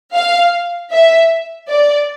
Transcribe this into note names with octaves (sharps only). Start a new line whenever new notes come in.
F5
E5
D5